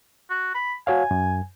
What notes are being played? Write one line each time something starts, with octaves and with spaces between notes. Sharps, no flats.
F#4
B5
F#4 C#5 F5 G#5
F#2